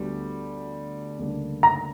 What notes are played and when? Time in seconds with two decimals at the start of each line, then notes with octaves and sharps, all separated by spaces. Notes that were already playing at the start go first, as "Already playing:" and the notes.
Already playing: D2 D3 G3 B3 F#4
1.19 D2 C#3 G3 A#3 D4
1.63 A#5